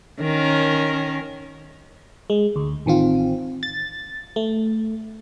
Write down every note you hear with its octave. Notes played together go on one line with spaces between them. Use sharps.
D#3 C#4 A#4
G#3
D2
A1 D#3 C4 F4
A6
A3